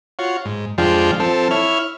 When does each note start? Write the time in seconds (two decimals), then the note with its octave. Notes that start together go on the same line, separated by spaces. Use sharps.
0.19 F4 F#4 C#5
0.45 G#2
0.78 F2 F3 G#3 D4 F4 G5
1.20 F3 C4 A4
1.51 E4 C#5 F6